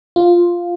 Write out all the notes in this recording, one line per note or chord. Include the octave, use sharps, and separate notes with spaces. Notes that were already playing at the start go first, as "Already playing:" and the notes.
F4